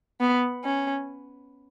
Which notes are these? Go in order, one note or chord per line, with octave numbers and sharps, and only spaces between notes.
B3
C#4